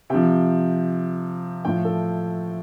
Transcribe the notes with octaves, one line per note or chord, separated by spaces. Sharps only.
C3 F3 G5
A2 F3 G5
A4